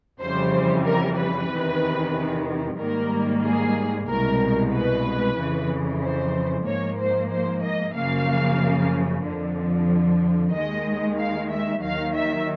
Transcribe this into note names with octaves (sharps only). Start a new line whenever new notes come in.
F2 C#3 E3 G3 C5
A#4
B4
E2 C3 D#3
G#2 D#3 G3 A#3 A#4
G#4
C2 B2 G#3 A#4
B4
F2 C#3 E3
C5
G#2 F3 A#3 C#5
C5
C5
D#5
F#2 C#3 F3 A#3 F5
F2 D3 F3
D#2 D#3 G#3 D#5
F5
E5
D#2 D#3 F#3 F5
E5